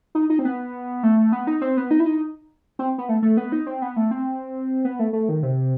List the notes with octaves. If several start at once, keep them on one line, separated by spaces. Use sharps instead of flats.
D#4
D#4
C4
B3
A3
B3
D#4
C4
B3
D#4
E4
D#4
C4
B3
A3
A3
B3
D#4
C4
B3
A3
C4
B3
A3
A3
D#3
C3